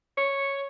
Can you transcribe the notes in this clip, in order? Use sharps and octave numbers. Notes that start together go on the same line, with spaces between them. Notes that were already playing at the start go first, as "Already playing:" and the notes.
C#5